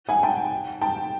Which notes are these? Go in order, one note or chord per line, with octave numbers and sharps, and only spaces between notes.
F#5 G#5
G5 A5
G5 A5